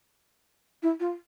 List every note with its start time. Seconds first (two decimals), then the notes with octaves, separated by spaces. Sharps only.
0.83 E4
1.00 F4